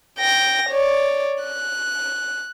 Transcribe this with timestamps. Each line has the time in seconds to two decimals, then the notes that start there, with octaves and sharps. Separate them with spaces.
0.20 G5 A#6
0.69 C#5 D5
1.43 F#6